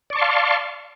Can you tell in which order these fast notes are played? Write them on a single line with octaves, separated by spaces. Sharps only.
D5 C#6 A5 C6 F5